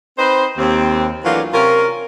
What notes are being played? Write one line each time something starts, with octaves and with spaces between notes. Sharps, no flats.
C4 D#4 B4 C5
D#2 C4
E3 F#3 A3 A#3 D4 F4
C3 C#4 F4 A#4